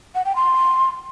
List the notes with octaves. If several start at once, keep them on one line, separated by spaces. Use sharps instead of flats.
F#5
G5
C6